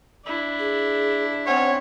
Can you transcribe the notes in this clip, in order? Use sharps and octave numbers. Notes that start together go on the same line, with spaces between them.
D4 E4
G#4
C4 C#4 C#5 F#5